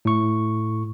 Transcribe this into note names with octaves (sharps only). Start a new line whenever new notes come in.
A2 C#6